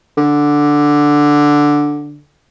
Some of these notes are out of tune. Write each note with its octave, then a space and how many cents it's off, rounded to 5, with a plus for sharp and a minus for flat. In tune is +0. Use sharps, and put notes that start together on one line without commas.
D3 +0